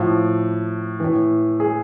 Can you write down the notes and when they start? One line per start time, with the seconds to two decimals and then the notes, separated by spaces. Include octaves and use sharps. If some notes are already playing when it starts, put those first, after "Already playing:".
Already playing: A2 F3 F4
1.00 A2 E3
1.60 G#4